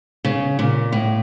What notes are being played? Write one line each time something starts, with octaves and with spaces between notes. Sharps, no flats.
C#3
A#2
A2